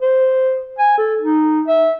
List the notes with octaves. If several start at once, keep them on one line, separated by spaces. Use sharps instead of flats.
C5
G#5
A4
D#4
E5